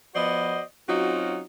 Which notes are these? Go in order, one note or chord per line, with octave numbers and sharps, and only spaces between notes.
F3 B3 F#4 C5 D5 D#5
F#3 C4 C#4 D#4 F4 F#4